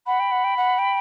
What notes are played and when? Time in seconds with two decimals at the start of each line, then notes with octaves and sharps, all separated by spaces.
0.06 F#5 B5
0.20 G5
0.31 F#5
0.44 G5
0.57 F#5
0.79 G5